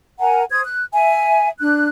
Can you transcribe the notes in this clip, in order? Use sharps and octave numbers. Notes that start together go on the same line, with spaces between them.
A#4 F#5 G#5 A#5
C5 D#6 G#6
F#6
E5 G#5
D4 F#6